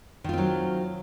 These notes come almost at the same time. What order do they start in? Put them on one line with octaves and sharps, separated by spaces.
D#3 F4 C4 F#3